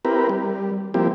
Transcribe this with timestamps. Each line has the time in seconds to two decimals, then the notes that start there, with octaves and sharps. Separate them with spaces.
0.05 C4 E4 G4 A#4 B4
0.29 G3
0.94 F3 G3 A#3 C4 E4 G4